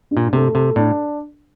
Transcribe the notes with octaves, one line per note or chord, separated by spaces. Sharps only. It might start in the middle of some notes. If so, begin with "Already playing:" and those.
G2
A#2
C3 A3
C3 A4
A2 D4